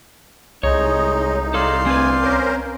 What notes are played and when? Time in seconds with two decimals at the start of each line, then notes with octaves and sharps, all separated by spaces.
0.63 C2 G#3 D#4 C#5 D#5
1.54 G#4 A4 D5 F5 C6
1.86 D2 C4 B4 G#5
2.22 C#4 A#4 C5